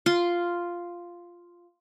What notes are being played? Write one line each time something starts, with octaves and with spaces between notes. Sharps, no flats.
F4 C6